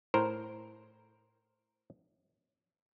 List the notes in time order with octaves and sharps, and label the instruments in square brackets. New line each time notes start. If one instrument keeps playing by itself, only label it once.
[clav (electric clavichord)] A2 A#4 C5